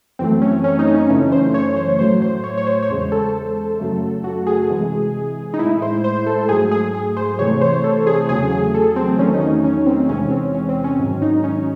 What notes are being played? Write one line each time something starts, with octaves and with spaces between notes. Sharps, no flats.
F#2 E3 A3 C4
C#4
C#4
D#4
C#4
F#2 C#3 E3 A3 C#4
C5
C#5
C5
A2 F#3 A3 C5
C5
C#5
C#5
C5
C#5
E2 C#3 G#3 C5
A4
F#2 C#3 F#3 A3
F#4
G#4
C3 E3 G#3
D#4
A2 G#3 E4
C5
C5
A4
G#2 F#3 A3 G#4
G#4
G#4
C5
C3 E3 A3 C#5
C5
A4
G#4
E2 C#3 F#3 A3 G#4
G#4
A4
C4
E2 D#3 F#3 A3 C#4
D#4
C#4
C#4
C4
E2 C3 E3 G#3 C#4
C4
C#4
C4
C#4
G#2 D#3 F#3 C#4
D#4
C#4